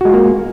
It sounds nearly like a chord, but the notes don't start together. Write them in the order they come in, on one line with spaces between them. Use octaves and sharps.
F#4 G#3 F4 A#3